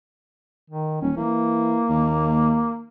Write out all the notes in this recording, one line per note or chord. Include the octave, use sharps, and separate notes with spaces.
D#3
D#1 C#4
E3 A#3
D#2